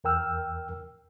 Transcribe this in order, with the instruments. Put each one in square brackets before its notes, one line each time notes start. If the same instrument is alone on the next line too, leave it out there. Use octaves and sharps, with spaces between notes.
[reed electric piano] E2 A#4 G5 E6 F6